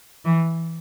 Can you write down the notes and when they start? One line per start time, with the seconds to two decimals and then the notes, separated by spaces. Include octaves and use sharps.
0.25 E3